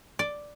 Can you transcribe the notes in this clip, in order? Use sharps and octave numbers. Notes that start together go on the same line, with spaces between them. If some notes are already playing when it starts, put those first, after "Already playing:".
D5